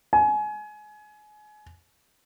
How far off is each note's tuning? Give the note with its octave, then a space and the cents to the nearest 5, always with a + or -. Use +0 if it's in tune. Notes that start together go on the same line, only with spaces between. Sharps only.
G#5 +30